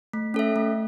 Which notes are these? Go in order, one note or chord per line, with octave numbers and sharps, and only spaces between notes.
A3
C#4 A4 E5
A3